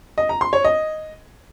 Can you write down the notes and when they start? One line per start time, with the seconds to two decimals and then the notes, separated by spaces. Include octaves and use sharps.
0.18 D#5
0.29 A#5
0.41 C6
0.53 C#5
0.65 D#5